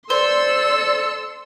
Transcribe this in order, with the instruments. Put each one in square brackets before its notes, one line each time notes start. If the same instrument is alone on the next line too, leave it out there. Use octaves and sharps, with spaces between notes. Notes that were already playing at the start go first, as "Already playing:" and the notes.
[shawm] A4 [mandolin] C5 [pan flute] D5 [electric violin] C6 E6